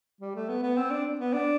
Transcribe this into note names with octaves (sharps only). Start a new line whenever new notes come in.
G3
A3
B3
B3
C4
D4
B3
D4